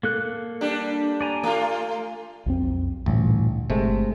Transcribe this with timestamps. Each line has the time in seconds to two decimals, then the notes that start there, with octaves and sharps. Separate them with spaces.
0.03 A#3 A4 F#6
0.61 G3 D4
1.21 D5 G#5 A#5
1.43 A3 F4
2.46 B1 F2 C4
3.06 A1 D2 G2 A#2
3.70 G1 C3 G#3 A3